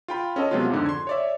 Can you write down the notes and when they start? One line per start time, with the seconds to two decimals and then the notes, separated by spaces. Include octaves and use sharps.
0.08 F4 G5 B5
0.36 C#4 A4 D#5 A5
0.51 C3 F#3 G#3 B3 F4
0.70 F2 G#2 D3
0.86 C6 G#6
1.07 C#5 D5 E5